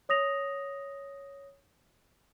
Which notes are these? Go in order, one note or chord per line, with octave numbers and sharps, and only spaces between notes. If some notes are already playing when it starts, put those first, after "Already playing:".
C#5 D#6 A#6 F7